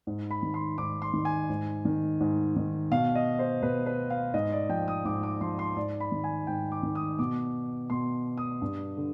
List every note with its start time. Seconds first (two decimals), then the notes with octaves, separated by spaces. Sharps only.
0.07 G#2
0.31 B5
0.43 D#3
0.54 C6
0.78 G#2 D6
1.02 C6
1.13 D#3
1.25 G#5
1.49 G#2
1.85 D#3
2.20 G#2
2.56 D#3
2.91 B2 F5
3.15 D#5
3.39 C5
3.62 B2 B4
3.86 B4
4.10 F5
4.34 G#2 D#5
4.52 D5
4.69 F3 G5
4.88 D#6
5.05 G#2 D6
5.23 D6
5.41 F3 C6
5.59 C6
5.76 G#2 D5
6.00 B5
6.12 D#3
6.24 G#5
6.47 G#2 G5
6.72 D6
6.83 D#3
6.95 D#6
7.19 B2 D6
7.90 B2 C6
8.38 D#6
8.62 G2
8.97 D3